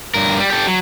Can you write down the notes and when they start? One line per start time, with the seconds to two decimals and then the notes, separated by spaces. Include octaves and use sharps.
0.14 G2 A#4
0.38 G3
0.50 G4 A4
0.67 F#3